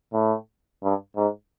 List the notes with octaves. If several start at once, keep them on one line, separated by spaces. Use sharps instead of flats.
A2
G2
G#2